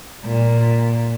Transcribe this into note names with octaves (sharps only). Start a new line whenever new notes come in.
A#2